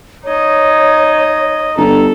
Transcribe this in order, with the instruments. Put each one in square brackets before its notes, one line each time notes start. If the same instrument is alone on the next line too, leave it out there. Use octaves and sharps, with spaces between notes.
[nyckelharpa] D#4 D#5 [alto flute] C#5
[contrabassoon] G1 [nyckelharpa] A4 [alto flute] A#5